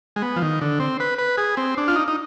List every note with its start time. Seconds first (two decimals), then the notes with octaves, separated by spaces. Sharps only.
0.16 G#3
0.22 B3
0.36 F3
0.42 D#3
0.61 D3
0.80 C4
1.00 B4
1.18 B4
1.38 G#4
1.57 C4
1.78 D4
1.88 F4
1.96 D#4
2.08 D#4